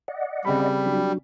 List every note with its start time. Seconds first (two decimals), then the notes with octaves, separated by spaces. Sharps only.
0.08 D5 D#5 F#5
0.45 C#3 G3 C4 B5
0.86 F#3 D4 F#4